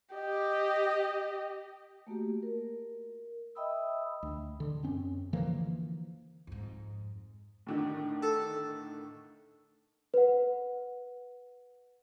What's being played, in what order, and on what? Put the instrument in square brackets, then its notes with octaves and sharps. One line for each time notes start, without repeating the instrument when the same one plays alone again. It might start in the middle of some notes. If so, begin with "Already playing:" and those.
[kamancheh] G4 D#5
[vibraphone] A3 A#3 F#4 G4
A#4
D#5 E5 G5 B5 D#6 E6
[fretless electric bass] D2
D3
F#2 C4 C#4
D3 E3 F3 A#3
[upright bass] F2 G#2
[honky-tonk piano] A2 D3 D#3
[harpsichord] A4
[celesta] B4 F#5